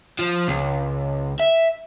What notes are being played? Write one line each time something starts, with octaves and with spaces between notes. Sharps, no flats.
F3
C#2
E5